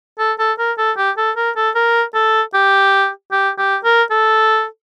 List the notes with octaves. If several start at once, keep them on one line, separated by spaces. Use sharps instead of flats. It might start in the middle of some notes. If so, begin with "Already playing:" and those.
A4
A4
A#4
A4
G4
A4
A#4
A4
A#4
A4
G4
G4
G4
A#4
A4